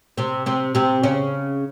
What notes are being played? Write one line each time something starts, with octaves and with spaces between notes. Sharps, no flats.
C3 C4
C3 C4
C3 C4
C#3 C#4